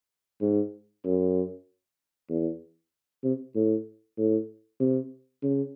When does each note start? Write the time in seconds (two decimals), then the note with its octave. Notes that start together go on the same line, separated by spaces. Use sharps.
0.41 G#2
1.05 F#2
2.30 E2
3.24 C3
3.55 A2
4.18 A2
4.80 C3
5.43 C#3